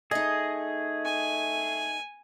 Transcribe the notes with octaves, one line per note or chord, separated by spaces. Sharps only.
A3 D#4 G#4 D#5
G#5